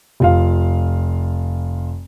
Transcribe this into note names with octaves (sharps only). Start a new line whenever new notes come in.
F1 F4 F5